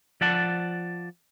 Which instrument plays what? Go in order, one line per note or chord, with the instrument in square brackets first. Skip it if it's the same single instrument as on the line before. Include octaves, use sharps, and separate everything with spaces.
[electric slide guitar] F3 D5 F#5 A5